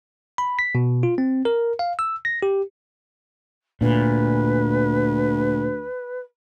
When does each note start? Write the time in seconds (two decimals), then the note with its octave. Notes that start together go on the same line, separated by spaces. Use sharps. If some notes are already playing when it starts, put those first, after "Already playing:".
0.38 B5
0.59 B6
0.75 B2
1.03 F4
1.18 C4
1.45 A#4
1.79 F5
1.99 E6
2.25 A#6
2.43 G4
3.81 D2 A#2 B4